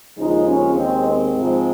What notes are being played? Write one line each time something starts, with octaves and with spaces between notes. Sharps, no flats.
D#2 C#3 F3 G#3 D#4
C#4
D#2 D#3 G#3 C4
C4
G#2 F3 G#3